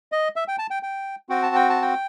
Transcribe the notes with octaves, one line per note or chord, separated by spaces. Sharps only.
D#5
E5
G5
A5
G5
G5
C4 F#4 G5
A5
G5
A5
G5